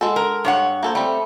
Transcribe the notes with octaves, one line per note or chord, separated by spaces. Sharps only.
G#3 F#4 A4
A#4
G2 C#5 F#5
A#3 A4 C5
G3 A3 C4